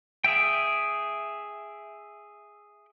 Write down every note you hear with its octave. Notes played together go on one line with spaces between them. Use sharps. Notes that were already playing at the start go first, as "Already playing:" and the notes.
G#4 E5 G5